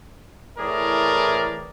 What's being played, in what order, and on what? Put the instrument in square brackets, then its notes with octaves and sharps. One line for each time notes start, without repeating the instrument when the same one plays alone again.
[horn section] A2 E3 G#4 A#4 D5